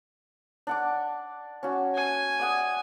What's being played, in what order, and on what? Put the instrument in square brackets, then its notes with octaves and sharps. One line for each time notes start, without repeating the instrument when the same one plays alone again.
[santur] D4 F#5 D6
C#4 F#4
[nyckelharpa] G#5
[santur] D5 F#5 D#6